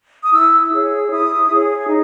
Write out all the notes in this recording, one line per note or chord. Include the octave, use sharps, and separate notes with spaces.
D#6
E4 E6
G#4 C#5
E4 D#6
G#4 C#5
D#4